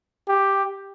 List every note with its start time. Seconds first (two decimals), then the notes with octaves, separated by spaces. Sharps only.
0.28 G4